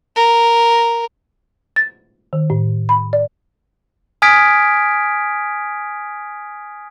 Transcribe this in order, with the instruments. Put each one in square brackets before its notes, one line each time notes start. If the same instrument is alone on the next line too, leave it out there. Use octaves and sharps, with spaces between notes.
[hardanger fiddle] A#4
[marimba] A6
D#3
A2
B5
D5
[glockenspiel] G#5 D#6 F6 G#6 B6 D7